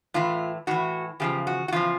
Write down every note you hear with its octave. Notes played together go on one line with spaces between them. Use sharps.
A2 E3 F4
A2 E3 F#4
E2 C#3 F3 G4
F#4
F#4
E2 C#3 F3 F4